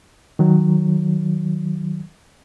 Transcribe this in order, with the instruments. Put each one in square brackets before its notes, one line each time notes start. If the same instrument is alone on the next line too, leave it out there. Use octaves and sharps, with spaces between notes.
[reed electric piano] D#3 F#3